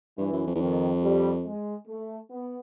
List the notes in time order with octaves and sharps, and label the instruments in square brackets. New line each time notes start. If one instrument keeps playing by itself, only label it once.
[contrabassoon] G2 [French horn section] E3
[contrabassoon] F#2
F2
E2
[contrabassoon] F2 [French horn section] D#3
[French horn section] G3
G#3
A3
B3